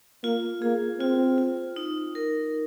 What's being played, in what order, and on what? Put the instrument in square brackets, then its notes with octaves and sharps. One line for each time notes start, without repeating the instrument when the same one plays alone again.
[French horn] A#3 [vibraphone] F4
[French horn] A#3 [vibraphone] G#4
[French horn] C4 [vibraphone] F4
[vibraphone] F4
D#4
A#4